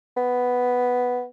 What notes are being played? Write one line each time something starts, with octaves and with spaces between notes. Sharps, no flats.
B3